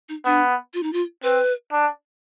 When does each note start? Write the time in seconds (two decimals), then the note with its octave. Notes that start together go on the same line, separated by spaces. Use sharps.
0.09 D#4
0.26 B3 D4
0.74 F4
0.83 D#4
0.93 F4
1.23 C4 B4
1.72 D4